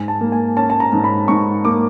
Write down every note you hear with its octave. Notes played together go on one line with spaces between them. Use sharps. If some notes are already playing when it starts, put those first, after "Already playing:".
Already playing: G#2 G#5
A5
A#3
G#5
C#4 A5
A5
A#5
G#2
B5
G#2 C#6
A#3 D6